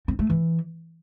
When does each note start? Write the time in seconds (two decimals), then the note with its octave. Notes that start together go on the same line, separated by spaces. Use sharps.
0.08 C4
0.19 A3
0.30 E3